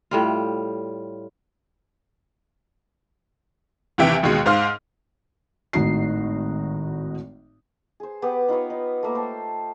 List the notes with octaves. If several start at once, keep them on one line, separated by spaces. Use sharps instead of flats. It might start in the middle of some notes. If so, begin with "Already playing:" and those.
A2 G3 F4
D#2 C3 E3 E5 G5 D7
A1 D#2 B2 G#3
G#2 C5 F5 F6
G#1 A2 D#4 F#4 C7
G#4 C5
B3 G4 B4
D#4 F4 B4 C#5
D#4
A3 A#3 A#4
C5 G5 A5